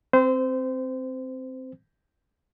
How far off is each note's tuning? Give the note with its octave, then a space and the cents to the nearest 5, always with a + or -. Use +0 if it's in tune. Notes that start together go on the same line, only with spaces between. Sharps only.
C4 +0 C5 -25